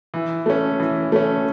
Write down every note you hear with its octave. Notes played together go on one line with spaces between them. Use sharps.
E3
A3 C#4
E3
A3 C#4